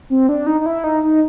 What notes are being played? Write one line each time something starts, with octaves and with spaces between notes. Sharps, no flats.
C4
D4
D#4
D#4
E4
D#4
D#4